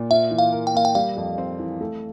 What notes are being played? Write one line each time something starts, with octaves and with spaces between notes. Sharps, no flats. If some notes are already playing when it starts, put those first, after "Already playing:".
Already playing: A#2
F4 E5
E3
F5
A#4
G5
A#3 F5
G5
G3 F5
F2
C4
E3
A3